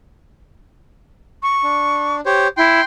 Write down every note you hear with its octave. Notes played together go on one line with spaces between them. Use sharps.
C#6
D4
G4 C5 C#5
E4 G5 C6